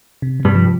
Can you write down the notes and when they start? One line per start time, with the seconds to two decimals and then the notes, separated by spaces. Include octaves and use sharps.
0.22 C3
0.40 C3
0.45 G2 G3
0.55 F3